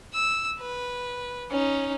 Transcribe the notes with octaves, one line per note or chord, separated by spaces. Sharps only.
E6
B4
C#4 D#4